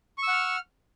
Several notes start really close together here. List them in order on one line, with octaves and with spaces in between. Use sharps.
C#6 E6 F#5 F6